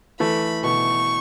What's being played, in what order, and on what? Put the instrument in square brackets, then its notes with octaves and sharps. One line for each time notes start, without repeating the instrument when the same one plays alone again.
[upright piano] E3 A3 [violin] B5
[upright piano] B2 E3 [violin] C#6